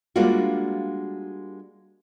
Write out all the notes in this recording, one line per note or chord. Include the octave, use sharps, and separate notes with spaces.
G3 G#3 A#3 D4 F4 F#4